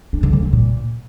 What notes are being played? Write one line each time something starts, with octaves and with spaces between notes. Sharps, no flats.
D4
D3
F3
D3
A#2